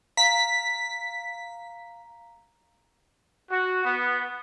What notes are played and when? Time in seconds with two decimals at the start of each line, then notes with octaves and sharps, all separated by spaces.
0.17 F5 A#5 B6
3.52 F#4
3.85 B3